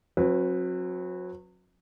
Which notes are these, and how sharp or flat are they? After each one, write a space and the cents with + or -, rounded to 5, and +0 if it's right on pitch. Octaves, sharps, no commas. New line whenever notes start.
F#3 -25 C4 +45 B4 +0